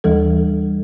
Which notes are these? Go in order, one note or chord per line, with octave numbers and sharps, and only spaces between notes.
D#2 E3 G3 A4